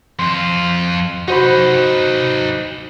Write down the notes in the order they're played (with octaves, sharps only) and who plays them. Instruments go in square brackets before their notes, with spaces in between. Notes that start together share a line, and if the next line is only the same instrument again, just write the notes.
[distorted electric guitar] F2 F4 [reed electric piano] C6
[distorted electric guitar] D#4 B4 [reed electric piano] F#4 C5 B5